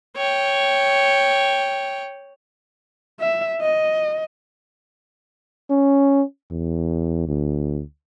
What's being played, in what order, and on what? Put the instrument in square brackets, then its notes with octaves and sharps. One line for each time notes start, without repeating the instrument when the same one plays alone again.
[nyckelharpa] C#5 G5
[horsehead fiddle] E5
D#5
[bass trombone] C#4
E2
D2